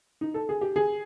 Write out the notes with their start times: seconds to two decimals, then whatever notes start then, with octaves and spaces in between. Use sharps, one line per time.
0.21 D#4
0.34 A4
0.49 G#4
0.61 G4
0.76 G#4